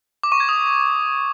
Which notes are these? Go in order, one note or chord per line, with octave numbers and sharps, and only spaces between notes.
D6
C#6
G#6
D#6